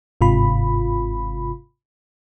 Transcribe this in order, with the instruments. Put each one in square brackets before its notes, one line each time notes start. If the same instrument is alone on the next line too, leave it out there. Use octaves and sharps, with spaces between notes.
[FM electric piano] G1 G#2 C3 F4 B5